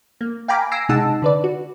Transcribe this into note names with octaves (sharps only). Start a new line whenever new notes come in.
A#3
F5 G5 G#5 A#5 B5 D6
G#5 E6 A#6 C7 D7
C3 G#3 D#4 F#5 A5 E6
D3 B4 D5
F#4